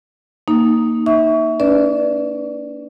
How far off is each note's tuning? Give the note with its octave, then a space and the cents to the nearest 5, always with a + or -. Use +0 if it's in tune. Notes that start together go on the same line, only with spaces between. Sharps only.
A#3 +0 D#4 +0
D#4 +0 E5 -20 C#6 +25
D4 -45 B4 +0 D5 +0